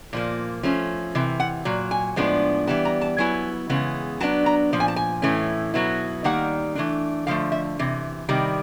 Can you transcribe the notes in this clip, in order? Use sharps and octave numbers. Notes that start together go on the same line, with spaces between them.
A#2 F3 A#3
F3 A3 C#4
C3 E3
F#5
A#2 F#3
G#5
A2 F3 G#3 B3 D4
E3 G3 B3 A5
A#5
A5
F#3 B3 E4 G#5
C#3 E3 G#3 B3
F#3 B3 D4 A5
A#5
A#2 F3
G#5
A5
G#5
A2 E3 A3 C#4
B2 F#3 B3 E4
D#3 G3 A#3 D#4 F#5
E3 A3 D4
D3 F3 A3 F5
E5
C3 E3
C3 D#3 G3